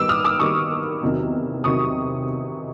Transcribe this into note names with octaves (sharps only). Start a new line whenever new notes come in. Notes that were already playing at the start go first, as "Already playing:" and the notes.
Already playing: D#3 G3 B3 D6 E6
D#6 F6
D6 E6
D#3 G3 B3 C#6 D#6
E2 C3 D#3 F#3
C3 D#3 F#3 C#6 D#6